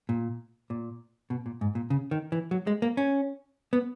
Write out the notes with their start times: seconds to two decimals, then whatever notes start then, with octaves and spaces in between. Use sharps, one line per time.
0.09 A#2
0.70 A#2
1.30 B2
1.46 A#2
1.61 G#2
1.75 A#2
1.90 C#3
2.11 D#3
2.32 E3
2.51 F#3
2.67 G#3
2.82 A#3
2.97 C#4
3.73 B3